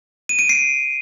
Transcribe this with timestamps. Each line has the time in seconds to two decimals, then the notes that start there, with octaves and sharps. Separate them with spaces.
0.29 D#7
0.39 D7
0.49 C7